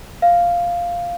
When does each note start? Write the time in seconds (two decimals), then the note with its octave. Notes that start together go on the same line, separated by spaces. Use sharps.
0.22 F5